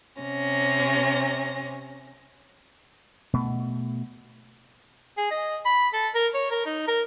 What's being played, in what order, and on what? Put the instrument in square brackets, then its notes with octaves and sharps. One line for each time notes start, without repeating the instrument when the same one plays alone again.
[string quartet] C3 C#4 A#6
[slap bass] B2 A3
[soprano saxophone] G#4
D#5
B5
A4
A#4
C#5
A#4
D#4
A#4